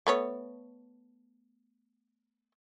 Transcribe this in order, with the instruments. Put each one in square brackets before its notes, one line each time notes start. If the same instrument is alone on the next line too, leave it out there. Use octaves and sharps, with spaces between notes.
[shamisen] A3 B3 C#5